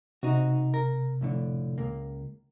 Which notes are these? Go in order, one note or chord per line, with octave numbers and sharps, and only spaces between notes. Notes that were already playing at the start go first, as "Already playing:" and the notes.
C3 D#4 F#4
A#4
F2 A2 D3
C#2 A#3